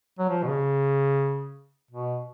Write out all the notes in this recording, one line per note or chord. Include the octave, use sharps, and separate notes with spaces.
F#3
F3
B2
C#3
B2